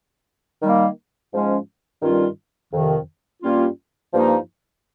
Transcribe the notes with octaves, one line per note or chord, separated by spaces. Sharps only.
D#3 G3 A#3
G#2 F3 G#3 C#4
G2 D#3 G3 C#4 F4
F2 C3 D#3
G2 G3 A#3 C#4 F4
G2 F3 A#3 D#4